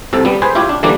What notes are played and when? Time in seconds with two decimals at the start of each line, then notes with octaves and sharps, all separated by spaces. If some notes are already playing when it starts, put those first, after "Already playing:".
0.13 C2 C3 A4
0.25 G3 B3
0.42 G#4 B4 C5
0.55 E4 F4 G4 C#5
0.69 D4
0.83 D3 E3 G3 A#3 D4